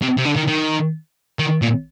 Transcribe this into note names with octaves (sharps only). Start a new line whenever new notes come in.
C3
C3
D3
D#3
D#3
D#3
A#2